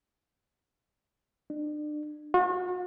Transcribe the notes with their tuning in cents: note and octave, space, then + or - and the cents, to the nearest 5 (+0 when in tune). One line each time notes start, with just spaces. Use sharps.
D4 +35
F#4 -40